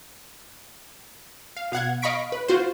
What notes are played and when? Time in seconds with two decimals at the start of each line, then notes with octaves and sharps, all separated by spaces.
1.57 F5
1.72 B2 F5 F#5 G#6
2.02 D#5 F5 B5 C#6 B6 D7
2.32 B4
2.48 F4 F#4 C5